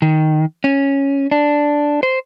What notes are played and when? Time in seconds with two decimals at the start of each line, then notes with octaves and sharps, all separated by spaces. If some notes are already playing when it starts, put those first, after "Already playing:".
0.02 D#3
0.64 C#4
1.31 D4
2.03 C5